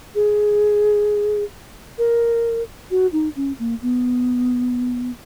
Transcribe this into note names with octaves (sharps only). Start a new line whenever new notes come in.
G#4
A#4
F#4
D#4
C#4
A#3
B3